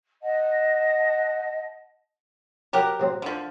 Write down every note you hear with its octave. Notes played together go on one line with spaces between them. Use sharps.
D#5 F#5 A5
F#3 G4 A#4 F#5
A1 F#3 C4
D3 F3